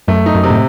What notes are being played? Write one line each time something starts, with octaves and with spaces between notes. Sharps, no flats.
F#2 A3
D#4
F#2
C3
A2